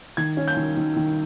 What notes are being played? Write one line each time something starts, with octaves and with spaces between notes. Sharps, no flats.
D#3 G#6
C#4
G6
D#3
D#3
D#3